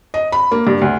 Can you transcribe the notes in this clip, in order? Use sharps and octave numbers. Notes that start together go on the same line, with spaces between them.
D#5
B5
A#3
G2
D2